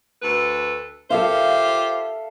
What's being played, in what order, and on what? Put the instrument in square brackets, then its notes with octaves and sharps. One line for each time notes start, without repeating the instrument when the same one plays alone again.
[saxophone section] D2 A4 B4
[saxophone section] F4 G4 C5 [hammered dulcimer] A4 E5 F5